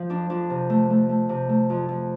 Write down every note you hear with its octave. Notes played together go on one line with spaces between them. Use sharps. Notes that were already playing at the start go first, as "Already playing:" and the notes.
Already playing: F3
F2 D4
F2 D4
C3
A3
A3
A3
C3
A3
F2
F2